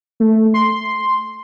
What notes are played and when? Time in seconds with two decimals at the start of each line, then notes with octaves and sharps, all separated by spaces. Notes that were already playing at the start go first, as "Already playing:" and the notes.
0.20 A3
0.54 C6